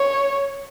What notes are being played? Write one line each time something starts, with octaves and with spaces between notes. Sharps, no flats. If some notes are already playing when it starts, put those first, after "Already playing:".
Already playing: C#5